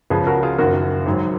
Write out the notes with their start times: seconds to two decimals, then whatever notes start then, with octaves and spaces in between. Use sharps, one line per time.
0.10 C#2 C#3 F3 G#4 B4
0.27 F#4 A#4
0.43 F4 G#4
0.58 F#1 F#2 D#3 F#4 A#4
1.06 G#1 G#2 F#3